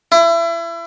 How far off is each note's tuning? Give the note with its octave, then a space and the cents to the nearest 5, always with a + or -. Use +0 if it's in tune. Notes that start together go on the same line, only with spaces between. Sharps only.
E4 +30